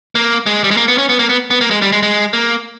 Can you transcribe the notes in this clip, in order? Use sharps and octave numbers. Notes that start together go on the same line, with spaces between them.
A#3
G#3
G3
G#3
A#3
B3
C#4
B3
A#3
B3
B3
A#3
G#3
G3
G#3
G#3
A#3